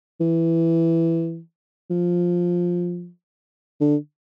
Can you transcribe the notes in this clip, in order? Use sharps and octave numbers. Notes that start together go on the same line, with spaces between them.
E3
F3
D3